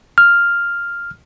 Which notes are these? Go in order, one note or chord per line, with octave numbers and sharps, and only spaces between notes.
F6